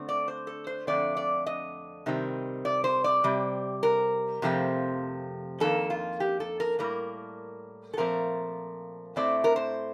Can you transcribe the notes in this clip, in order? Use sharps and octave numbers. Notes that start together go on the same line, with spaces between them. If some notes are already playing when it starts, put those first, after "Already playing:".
Already playing: D3 A3 C4
D5
C5
A4
C5
F2 D3 A3 C4 D5
D5
D#5
C3 D#3 G3 C4
D5
C5
D5
C3 G3 C4
A#4
F2 C3 F3 A3 C4
F2 D#3 A#3 A4
F4
G4
A4
A#4
A2 G3 A#3 A#4
A4
A#2 F3 A3 C4 A#4
A2 A3 C4 D5
A#4
C5